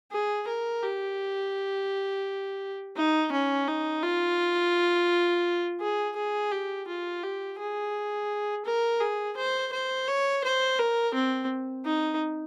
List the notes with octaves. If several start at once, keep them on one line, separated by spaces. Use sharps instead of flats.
G#4
A#4
G4
D#4
C#4
D#4
F4
G#4
G#4
G4
F4
G4
G#4
A#4
G#4
C5
C5
C#5
C5
A#4
C4
D#4